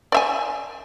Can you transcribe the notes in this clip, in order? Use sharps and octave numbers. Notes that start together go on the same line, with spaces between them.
D5 E5 G#5